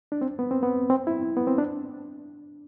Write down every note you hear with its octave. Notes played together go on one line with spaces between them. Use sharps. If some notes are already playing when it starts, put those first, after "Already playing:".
D4
C4
B3
C4
B3
C4
E4
B3
C4
D4